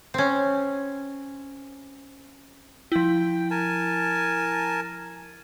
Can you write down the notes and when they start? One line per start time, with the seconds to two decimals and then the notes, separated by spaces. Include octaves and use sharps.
0.14 C4 C#4
2.92 F3 E4 G5
3.51 A#4 G#5 A5